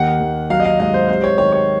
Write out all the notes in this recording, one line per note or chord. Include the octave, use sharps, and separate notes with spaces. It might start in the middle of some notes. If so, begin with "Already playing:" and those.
Already playing: D#2 D#3 F#5
D#2
F#3 F5
D#5
F5
G#2 D#5
C5
C3 C5
C#5
D#3 C#5
C#5